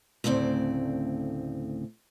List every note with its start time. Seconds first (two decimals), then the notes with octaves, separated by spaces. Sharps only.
0.24 D2 A2 C#3 C4 D5